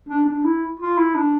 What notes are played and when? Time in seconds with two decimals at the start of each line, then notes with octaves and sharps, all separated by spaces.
0.09 D4
0.27 D4
0.45 E4
0.80 F4
0.98 E4
1.15 D4